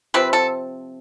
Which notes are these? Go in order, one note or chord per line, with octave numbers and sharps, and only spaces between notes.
C3 F3 C4 B4
A4